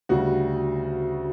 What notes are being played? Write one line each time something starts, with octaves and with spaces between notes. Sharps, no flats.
D2 C#3 G3 F#4